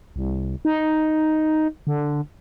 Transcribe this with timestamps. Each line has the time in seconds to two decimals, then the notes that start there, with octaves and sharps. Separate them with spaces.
0.16 C2
0.65 D#4
1.87 D3